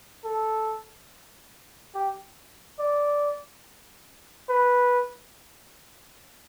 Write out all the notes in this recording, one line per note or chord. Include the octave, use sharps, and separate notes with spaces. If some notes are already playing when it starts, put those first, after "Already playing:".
A4
G4
D5
B4